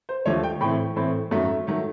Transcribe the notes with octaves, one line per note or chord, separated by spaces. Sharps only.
C5
D#2 D3 F3 A3 C#5
G5
A2 E3 A3 C4 G5
A2 E3 A3 C4
F#2 D#3 F#3 A3 E5
D#3 F#3 A3